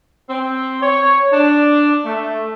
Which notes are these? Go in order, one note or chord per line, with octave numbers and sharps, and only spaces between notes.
C4
C#5
D4
A3